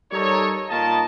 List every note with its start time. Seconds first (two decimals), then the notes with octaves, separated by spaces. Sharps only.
0.12 G3 D#4 A4 A#4 C#5
0.69 A#2 D#3 F4 A#4 D#5 A5